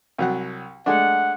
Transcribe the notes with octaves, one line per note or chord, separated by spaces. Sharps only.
C2 F#3 F#5
G#3 A3 D4 F#5